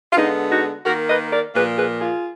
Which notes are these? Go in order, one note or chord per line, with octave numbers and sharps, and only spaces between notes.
F4
D3 G#3 B3 D#4
D#4 F#4
D#3 A#3 F#4 A#4
B4 D#5
A#4 D5
A#2 F3 A#3 G#4 B4
G#4 B4
F4 G#4